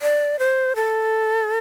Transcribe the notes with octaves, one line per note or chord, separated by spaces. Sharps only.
D5
C5
A4